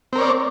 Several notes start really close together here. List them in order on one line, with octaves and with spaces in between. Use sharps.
C4 A#4 C#5 D5